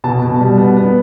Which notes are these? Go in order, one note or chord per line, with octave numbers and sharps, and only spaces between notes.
B2 A5
B2
G3
B3
B3